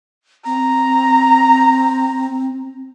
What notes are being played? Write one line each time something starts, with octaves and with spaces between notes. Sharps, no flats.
C4 A#5